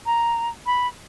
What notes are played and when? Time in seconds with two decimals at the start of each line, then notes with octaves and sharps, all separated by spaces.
0.06 A#5
0.66 B5